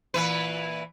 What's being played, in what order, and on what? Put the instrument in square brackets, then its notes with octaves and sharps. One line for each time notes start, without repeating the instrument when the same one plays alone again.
[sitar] A#2 E3 B4